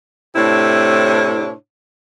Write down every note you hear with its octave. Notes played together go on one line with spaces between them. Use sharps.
A2 C3 D4 E4 C#5